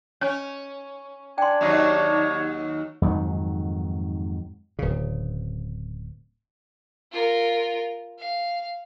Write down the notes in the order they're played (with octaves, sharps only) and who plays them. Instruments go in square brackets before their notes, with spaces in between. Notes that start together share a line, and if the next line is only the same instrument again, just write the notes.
[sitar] C#4 [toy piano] C#5 G#5
[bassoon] D4 [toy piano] G5 C6 [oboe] G#5
[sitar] D#2 F#3 D#4 [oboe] C#5
[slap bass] F2 G#2 D#3 F#3
D1 C#3
[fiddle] F4 A#4
F5